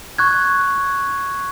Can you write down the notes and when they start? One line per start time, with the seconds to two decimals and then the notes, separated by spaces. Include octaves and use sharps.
0.19 C#6 F#6 G#6